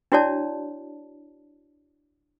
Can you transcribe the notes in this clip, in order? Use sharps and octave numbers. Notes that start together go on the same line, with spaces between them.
D4 E4 F#4 C#5 D5 A5